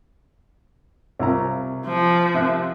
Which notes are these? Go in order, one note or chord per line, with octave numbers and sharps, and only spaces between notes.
C2 F4 A#5
F3
C3 E5 F#6